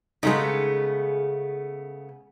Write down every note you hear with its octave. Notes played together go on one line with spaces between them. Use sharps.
C#3 G#3 A3 B3 D#4